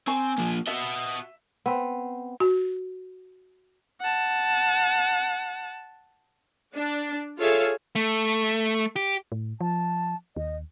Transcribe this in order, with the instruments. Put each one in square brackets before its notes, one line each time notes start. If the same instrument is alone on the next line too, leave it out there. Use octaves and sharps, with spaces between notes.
[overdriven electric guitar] C4 [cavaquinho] G#5 C#6
[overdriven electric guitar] F3 A#3
[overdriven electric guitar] F#4 D#5 [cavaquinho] E5
[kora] B3 C4
[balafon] F#4
[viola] F#5 A5
[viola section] D4
F4 G#4 A4 C#5 E5 F5
[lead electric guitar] A3
G4
[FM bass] A2
[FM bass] F3 [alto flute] A5
[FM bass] D#2 [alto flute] D#5